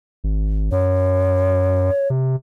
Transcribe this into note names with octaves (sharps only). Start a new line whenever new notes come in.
G#1
F#2 C#5
C3